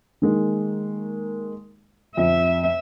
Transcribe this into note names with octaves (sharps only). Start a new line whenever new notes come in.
D#3 G#3 A#3
F2 E5